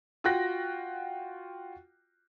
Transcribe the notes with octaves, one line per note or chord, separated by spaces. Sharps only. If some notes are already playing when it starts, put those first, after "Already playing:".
F4 F#4 G5 F#6 A#6